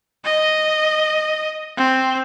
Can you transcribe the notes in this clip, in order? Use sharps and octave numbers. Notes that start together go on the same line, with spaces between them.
D#5
C4